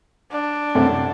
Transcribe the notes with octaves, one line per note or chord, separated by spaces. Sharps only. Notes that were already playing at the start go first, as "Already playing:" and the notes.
D4
C2 F#2 A3